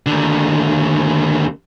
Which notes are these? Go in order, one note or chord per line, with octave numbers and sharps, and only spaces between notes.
D#2 D3